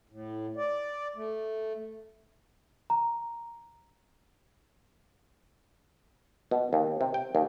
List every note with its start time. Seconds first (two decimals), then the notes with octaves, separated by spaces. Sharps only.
0.09 A2
0.57 D5
1.16 A3
2.90 A#5
6.51 B2
6.73 D#2
7.01 C3
7.14 G5
7.35 D#2